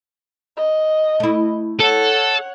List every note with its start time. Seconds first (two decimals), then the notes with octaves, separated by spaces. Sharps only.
0.57 D#5
1.20 A3 E4
1.80 A4 C#5 F#5